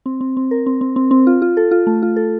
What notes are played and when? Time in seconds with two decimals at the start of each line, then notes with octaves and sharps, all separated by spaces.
0.06 C4
0.21 C4
0.37 C4
0.51 A#4
0.66 C4
0.81 C4
0.96 C4
1.11 C4
1.27 F4
1.42 F4
1.57 A4
1.71 F4
1.87 A3
2.02 F4
2.16 A4